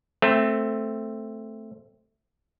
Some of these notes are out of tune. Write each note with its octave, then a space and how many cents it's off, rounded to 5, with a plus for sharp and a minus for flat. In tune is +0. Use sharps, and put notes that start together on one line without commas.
A3 +0 C4 +0